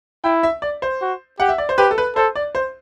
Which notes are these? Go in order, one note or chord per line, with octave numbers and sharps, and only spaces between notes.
E4 G5
E5
D5
C5
F#4
G4 F#5
E5
D5
C5
G4 B4
A4
B4
A4 C5
D5
C5